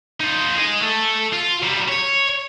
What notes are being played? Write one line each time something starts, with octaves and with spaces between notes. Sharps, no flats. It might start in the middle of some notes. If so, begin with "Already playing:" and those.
D#4 F4
G#4 D#5
A3 A4
F4
F#3 G3
C#5